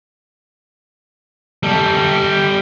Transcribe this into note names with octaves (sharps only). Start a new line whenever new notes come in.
G3 A4